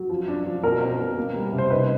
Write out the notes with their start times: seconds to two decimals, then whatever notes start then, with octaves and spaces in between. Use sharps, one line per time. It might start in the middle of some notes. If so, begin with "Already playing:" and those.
Already playing: F#3
0.09 F3
0.28 D4
0.46 F3
0.63 B2 A#4
0.81 C4
1.00 B2
1.18 A#3
1.35 G3
1.53 C3
1.58 C5
1.71 D#4 B4